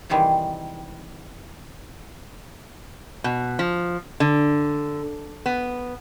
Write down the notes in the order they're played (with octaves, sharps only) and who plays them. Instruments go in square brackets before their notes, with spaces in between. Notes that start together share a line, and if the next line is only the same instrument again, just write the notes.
[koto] C3 D#3 E3 G3 G#3
[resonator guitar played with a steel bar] B2
F3
D3
B3